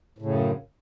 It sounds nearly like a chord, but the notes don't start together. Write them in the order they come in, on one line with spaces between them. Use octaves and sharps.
A2 C#3 F#2